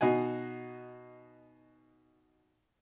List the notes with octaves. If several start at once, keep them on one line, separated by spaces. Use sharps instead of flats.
B2 D#4 F#4 G#5